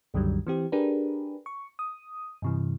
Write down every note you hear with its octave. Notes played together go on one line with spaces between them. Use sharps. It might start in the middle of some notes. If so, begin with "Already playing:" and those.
C2 F#2 D3 D#3 F#3 G3
E3 C4 G4
D4 G4 G#4 A#4 B4
C#6
D#6
G2 C3 E3